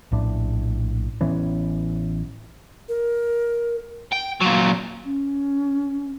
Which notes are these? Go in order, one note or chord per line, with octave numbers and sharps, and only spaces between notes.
A#1 A2 D4
A1 E3 B3 C#4
A#4
G5
A#2 F#3
C#4